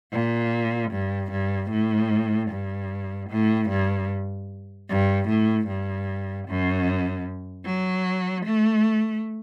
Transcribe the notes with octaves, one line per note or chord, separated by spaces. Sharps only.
A#2
G2
G2
A2
G2
A2
G2
G2
A2
G2
F#2
F#3
A3